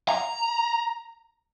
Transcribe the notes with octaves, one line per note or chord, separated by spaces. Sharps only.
A#5